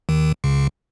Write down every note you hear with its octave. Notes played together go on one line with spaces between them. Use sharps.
D#2 D#3
C#2 C#3